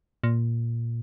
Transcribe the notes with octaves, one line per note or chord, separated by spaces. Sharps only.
A#2